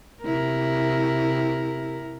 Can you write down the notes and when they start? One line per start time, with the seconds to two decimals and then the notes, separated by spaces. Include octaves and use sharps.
0.23 C3 E4 A#4